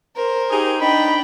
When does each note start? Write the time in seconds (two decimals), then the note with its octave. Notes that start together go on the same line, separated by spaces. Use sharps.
0.16 A#4 C5
0.51 D#4 G4 G#4
0.80 D4 D#4 G5 B5